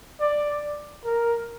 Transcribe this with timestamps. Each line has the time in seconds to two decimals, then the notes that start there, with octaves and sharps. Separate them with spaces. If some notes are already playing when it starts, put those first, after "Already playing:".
0.21 D5
1.05 A#4